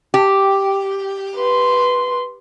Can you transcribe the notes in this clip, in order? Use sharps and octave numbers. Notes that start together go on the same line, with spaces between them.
G4
B4 C6